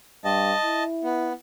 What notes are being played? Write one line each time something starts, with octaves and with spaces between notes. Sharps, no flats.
G2 D#5 A5
E4
B3